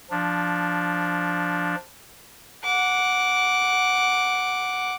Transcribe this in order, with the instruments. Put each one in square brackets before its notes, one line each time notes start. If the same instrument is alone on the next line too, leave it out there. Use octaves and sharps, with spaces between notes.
[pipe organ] F3 D4
[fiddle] F#5 D6